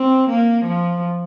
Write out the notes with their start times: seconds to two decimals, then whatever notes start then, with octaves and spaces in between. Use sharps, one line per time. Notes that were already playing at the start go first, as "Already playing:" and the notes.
Already playing: C4
0.29 A#3
0.64 F3